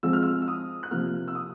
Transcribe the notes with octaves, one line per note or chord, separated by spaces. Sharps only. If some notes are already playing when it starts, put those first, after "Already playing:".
F3 G#3 C4 E6
F6
E6
E6
D#6
F#6
C3 F3 A#3 F6
E6
D#6